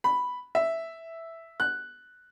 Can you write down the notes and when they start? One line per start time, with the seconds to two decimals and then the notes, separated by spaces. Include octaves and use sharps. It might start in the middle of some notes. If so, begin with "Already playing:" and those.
0.04 B5
0.55 E5
1.60 F#6